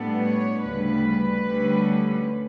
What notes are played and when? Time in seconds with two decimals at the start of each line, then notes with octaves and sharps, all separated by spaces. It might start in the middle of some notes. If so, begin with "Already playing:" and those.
Already playing: A2 G3 B3 D4 A4
0.23 C#5
0.64 D2 C#3 G3 B4
1.47 D2 D3 G3 C#4